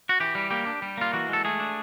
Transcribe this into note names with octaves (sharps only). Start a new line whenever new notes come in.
F#4
E3 G4
G3
A#3 G4
D4
G3
A#3 F4
E3 F#4
G#3 A4
A3 G#4
D4